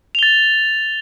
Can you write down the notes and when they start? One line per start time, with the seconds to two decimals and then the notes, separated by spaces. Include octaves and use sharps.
0.15 F7
0.19 G7
0.23 A6